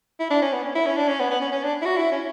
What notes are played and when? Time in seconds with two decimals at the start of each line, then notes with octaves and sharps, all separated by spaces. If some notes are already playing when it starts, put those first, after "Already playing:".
0.19 E4
0.30 D4
0.42 C#4
0.53 B3
0.64 C#4
0.75 E4
0.86 C#4
0.97 D4
1.08 C#4
1.20 B3
1.30 B3
1.41 C#4
1.52 C#4
1.63 D4
1.82 E4
1.86 F#4
1.97 E4
2.11 C#4